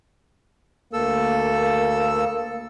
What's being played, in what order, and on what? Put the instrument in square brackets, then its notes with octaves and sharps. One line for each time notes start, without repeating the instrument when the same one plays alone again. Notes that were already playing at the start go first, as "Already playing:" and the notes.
[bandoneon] D2 A4 E6 [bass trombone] A#3